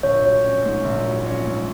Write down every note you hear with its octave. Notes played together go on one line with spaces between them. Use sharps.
A#1 C#5
F#3
C#4
G#2
A#1
F#3
C#4
G#2